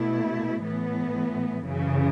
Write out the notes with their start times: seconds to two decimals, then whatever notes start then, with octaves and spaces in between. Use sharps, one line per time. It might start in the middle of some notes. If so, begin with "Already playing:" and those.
Already playing: B2 A3 E4
0.63 A2 E3 B3
1.64 F#2 C#3 E3